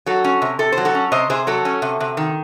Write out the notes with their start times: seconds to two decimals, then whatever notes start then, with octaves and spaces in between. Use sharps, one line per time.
0.06 F#3 F#4 A4
0.24 C#4
0.42 C3
0.59 C3 A4
0.72 C5
0.78 F#3
0.85 F#4 A4
0.95 C#4
1.12 C3 C5 D#5
1.30 C3 G#4 C5
1.47 F#3 F#4 A4
1.65 C#4
1.82 C3
2.00 C3
2.17 D#3